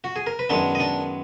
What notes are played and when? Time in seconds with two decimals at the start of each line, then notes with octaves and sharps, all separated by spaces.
0.04 F#4
0.16 G#4
0.27 A#4
0.39 B4
0.49 F#2 D#3 G#3 B3 D4 D5
0.75 D#5
0.80 D4 D5